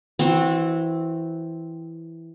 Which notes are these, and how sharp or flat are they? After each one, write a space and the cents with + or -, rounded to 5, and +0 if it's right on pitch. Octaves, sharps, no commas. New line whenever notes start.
E3 +0 C4 +5 F#4 -20